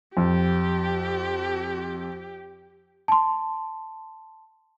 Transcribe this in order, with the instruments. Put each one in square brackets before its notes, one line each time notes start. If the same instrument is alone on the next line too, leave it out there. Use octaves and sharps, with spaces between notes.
[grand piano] F2 [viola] G4
[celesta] A5 C6